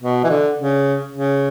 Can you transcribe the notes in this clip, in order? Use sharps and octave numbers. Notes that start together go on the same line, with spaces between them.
B2
E3
D3
C#3
C#3